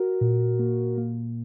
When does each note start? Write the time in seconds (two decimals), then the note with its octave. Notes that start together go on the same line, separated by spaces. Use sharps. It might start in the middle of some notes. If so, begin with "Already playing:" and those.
Already playing: F#4 A#4
0.21 A#2
0.59 A#3
0.98 A#3